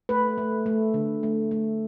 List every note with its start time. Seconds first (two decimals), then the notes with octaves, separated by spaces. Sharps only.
0.09 A3 B4
0.38 A3
0.66 A3
0.94 D3
1.23 A3
1.51 A3